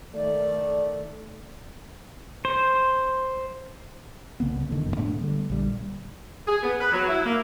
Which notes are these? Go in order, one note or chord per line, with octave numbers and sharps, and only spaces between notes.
D#3 A3 D5
C5
C2 C#3 A#3 B3
E1 D3 D#3
F#1 F#2
A2 A3 B3 D4
D3 G3
A#1 G3
G#4
B3
B4
F#3
E4
A#3